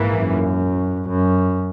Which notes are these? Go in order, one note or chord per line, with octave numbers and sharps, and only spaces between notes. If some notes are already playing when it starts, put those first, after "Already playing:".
Already playing: A#1 G#2 E3 A#3
F#2
F#2